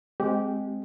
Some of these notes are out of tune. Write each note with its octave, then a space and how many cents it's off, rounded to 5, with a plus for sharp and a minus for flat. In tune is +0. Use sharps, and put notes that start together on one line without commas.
G#3 +0 C4 +0 G4 -15